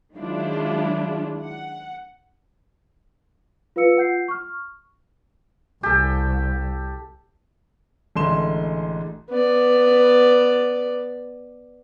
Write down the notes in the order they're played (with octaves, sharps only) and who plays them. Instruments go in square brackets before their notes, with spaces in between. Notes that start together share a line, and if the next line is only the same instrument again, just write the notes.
[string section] D#3 F#3 G#3 D4 E4 F4
F#5
[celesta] F4 B4 F5 E6 C#7
F4 F#5 G6 C7
C#6 F6
[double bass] C2 [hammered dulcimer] G4 A4
[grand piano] A1 D3 G#3 C6 E7
[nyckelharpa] B3 D5